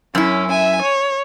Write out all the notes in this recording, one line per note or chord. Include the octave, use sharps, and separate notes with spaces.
F#2 C#4 E4
E5 G#5
C#5